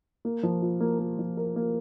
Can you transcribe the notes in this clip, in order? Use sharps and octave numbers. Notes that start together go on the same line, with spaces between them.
A#3
F3
F4
A#3
A#3
F3
A#4
A#3